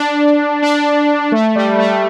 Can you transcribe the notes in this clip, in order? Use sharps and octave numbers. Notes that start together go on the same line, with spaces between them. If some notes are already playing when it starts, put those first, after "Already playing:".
Already playing: D4
D4
A3
G3
A3